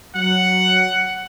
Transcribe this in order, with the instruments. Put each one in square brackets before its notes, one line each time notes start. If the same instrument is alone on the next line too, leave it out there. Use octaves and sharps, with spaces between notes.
[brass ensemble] F#3 [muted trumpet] F#5